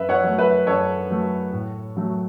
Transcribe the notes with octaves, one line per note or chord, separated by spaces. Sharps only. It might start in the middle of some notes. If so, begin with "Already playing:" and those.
Already playing: F#2 B4 E5
C#5 F#5
F#3 A3
B4 E5
F#2 A4 C#5
F#3 A3
A2
F#3 A3